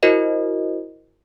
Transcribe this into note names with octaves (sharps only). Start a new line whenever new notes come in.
E4 F#4 A#4 C5 D#5